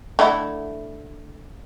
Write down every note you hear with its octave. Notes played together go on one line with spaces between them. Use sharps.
D3 A3 E4